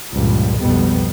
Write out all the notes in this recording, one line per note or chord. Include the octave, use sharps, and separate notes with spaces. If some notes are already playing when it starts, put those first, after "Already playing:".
C#2 G2 A#2 F3 G3
B1 F2 G#2 B2 G3 B3